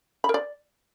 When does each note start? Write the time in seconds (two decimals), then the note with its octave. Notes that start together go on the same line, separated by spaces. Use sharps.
0.24 B5
0.29 A#4
0.34 D5